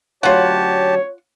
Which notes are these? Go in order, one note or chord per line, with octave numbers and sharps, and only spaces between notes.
D2 F#3 C#4 F4 G4 C#5 F#5 A5